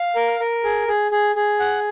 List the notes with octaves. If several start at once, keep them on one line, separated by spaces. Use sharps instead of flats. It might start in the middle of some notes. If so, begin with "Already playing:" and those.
Already playing: F5
A#4
A#4
G#4
G#4
G#4
G#4
F#5